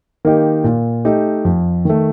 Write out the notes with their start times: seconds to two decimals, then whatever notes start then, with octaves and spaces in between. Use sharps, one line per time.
0.25 D#3 A#3 D#4 G4
0.64 A#2
1.05 A3 D#4 G4
1.45 F2
1.85 D#3 A3